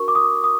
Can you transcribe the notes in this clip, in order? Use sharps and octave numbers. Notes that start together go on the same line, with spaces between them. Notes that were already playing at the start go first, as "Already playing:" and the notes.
Already playing: D4 F#4 A#4 C#6
D6
D#6
D#6